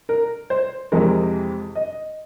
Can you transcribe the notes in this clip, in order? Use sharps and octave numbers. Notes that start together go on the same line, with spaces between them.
A#4
C5
F2 C3 E3 G#3 A#4
D#5